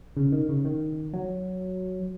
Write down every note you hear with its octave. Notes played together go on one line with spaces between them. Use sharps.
C#3
D#3
C#3
D#3
F#3